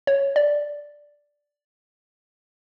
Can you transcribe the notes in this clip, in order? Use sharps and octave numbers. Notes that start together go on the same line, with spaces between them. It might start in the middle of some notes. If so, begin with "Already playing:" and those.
C#5
D5